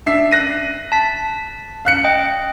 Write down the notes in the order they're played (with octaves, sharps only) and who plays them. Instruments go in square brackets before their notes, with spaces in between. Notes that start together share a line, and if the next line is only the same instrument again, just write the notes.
[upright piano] D4 E5 C7
F#6 A#6 D#7
[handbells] A5 B6
[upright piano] F5 F#6 C#7
[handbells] D#5 G5